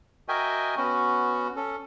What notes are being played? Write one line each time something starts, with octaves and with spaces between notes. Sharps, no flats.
F#4 A#4 D#5 E5 G5 G#5
B3 C#4 F#4
C#4 A4